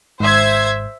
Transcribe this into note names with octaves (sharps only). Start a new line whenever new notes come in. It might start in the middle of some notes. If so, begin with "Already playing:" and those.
G#1 G#2 C5 E5 G#6